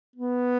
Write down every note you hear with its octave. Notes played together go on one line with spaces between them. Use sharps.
B3